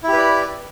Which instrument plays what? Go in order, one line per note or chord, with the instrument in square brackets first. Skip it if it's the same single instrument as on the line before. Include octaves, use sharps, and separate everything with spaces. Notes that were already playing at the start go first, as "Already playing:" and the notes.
[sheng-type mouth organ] E4
G4
B4
D5